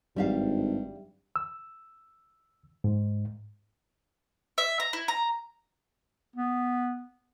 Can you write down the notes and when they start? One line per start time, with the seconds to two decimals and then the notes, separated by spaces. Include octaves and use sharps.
0.16 G#1 G2 G3 E5 F5
1.36 E6
2.84 G#2
4.58 E5
4.80 A#5
4.93 E4
5.08 A#5
6.36 B3